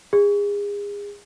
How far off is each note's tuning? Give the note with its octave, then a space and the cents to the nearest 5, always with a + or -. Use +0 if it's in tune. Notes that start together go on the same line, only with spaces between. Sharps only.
G#4 -30